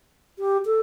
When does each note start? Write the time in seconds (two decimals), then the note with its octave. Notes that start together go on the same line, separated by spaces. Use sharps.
0.39 G4
0.65 A4